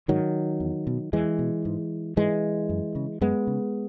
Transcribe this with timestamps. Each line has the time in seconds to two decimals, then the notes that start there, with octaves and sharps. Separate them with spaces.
0.08 G#2 D#3 F#3
0.60 E2
0.87 B2
1.13 E2 E3 G#3
1.39 B2
1.65 G#2
2.17 G#2 E3 G#3
2.69 F#2
2.95 C#3
3.21 F#2 G#3 B3
3.47 C#3